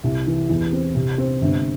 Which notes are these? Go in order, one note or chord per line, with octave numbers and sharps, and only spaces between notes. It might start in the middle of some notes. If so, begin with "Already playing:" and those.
C2
E3
E2
C4
C3
C4
G1